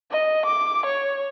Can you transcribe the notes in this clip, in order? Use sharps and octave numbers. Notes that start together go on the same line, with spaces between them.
D#5
D6
C#5